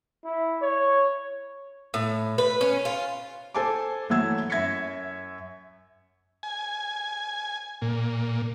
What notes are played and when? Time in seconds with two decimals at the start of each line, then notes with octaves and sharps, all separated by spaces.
0.25 E4
0.62 C#5
1.94 A2
2.38 B4
2.61 C#4
2.85 F4
3.54 A4 C5 G#5 A5 D6
4.10 E3 F#3 A3 E6 G#6
4.50 F#2 E5 G#6 A#6 B6 C#7
6.43 G#5
7.82 A#2